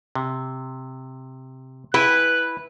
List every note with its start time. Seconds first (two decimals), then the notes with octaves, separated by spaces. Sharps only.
0.15 C3
1.94 E4 B4 G5 G#5 F#6